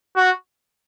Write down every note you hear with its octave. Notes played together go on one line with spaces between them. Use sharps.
F#4